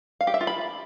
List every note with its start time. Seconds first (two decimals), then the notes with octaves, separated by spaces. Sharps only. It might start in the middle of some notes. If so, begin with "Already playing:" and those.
0.21 F5
0.27 G4
0.34 E5
0.41 F4
0.47 B5